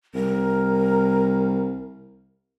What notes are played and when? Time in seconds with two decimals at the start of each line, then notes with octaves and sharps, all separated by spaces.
0.15 C2 A#4